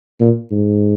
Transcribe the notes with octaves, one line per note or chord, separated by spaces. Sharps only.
A#2
G#2